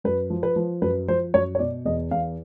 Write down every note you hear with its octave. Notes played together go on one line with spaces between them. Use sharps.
F#2 B4
F3
B4
F3
F#2 B4
F3 C5
F#2 C#5
C#5
B2 D5
E2 D#5
E2 F5